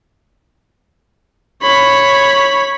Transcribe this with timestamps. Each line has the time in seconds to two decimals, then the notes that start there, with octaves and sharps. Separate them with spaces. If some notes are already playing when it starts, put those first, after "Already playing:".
1.63 C#5 B5